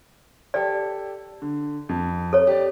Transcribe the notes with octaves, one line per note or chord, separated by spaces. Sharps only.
G4 A4 D5 G5
D3
F2
A4 C#5
G4 D5